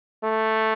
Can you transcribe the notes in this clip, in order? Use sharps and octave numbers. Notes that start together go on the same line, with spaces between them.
A3